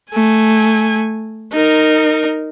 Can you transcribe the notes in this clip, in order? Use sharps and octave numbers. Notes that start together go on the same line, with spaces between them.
A3 G#5
D#4 A#4